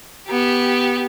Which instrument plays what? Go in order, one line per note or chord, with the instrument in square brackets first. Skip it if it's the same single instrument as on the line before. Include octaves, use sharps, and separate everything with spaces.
[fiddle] B3 G4